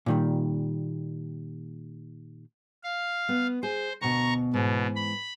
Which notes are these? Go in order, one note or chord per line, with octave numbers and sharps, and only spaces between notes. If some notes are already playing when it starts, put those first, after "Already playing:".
A#2 D#3 G3
F5
B3
G#4 C5
D2 B2 A#5 C#6
G#2 B2 E3
B5